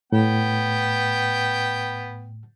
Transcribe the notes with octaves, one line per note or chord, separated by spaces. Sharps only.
A2 B3 G5